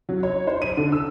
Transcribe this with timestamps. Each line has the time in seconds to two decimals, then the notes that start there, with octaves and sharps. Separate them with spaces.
0.09 F#3
0.23 C#5
0.47 C5
0.62 D#7
0.77 D3
0.92 E6